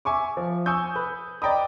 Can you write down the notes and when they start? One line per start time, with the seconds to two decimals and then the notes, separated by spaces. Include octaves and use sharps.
0.05 E5 G#5 C#6 D6
0.37 F3
0.66 G#5 C#6 D#6 E6 G6
0.96 B4
1.42 D5 D#5 G5 A#5 B5 D#6